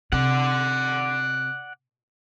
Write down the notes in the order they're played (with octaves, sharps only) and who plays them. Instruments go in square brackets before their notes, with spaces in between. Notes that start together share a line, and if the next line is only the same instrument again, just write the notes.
[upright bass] C3 [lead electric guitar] D5 F#5